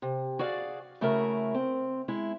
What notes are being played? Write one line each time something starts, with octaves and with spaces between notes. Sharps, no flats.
C3
F#4 G#4 D5 F5
C#3 A3 E4 F#4 A#4
C4
G#3 E4